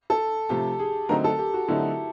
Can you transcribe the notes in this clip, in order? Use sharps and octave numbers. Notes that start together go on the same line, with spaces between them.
A4
C3 F3 A3 G4
G#4
D3 F#3 A3 C4 D#4 A#4
A4
G4
F#4
D3 F#3 A3 C4 D#4 E4